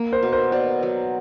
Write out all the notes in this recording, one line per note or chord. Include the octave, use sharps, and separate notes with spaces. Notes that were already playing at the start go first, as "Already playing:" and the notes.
Already playing: A#3
A#4 C5
B2
A#4 C5
B2 C5 D5
F#3